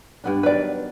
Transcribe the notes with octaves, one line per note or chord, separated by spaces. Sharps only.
G2 B3 D4
D#3 F#3 B4 D5